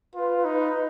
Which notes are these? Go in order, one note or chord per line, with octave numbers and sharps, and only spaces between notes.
F4 B4
B4
D#4
B5